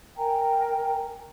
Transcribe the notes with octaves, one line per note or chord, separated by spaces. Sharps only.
A#4 G5 G#5 A#5